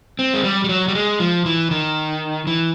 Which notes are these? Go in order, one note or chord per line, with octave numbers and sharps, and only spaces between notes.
C4
G#3
G3
G3
F#3
G3
G#3
F3
E3
D#3
E3